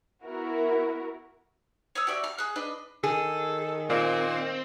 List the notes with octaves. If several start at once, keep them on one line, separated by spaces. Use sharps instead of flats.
B3 E4 F#4 A#4
C#5 D#6 E6
F#4 G4 D5 E5
F6
G#4 F#6
D4 B4 D#5
D#3 G#4 A4
A#2 C4